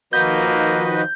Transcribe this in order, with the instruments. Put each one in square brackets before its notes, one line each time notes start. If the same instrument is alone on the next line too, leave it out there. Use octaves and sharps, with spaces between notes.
[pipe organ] D#3 F3 [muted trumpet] A#3 [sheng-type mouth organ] F#4 B4 D#5 [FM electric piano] G6